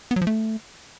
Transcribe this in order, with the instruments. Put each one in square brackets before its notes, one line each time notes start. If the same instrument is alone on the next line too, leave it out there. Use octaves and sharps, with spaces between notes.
[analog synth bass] B3
F#3
F3
A3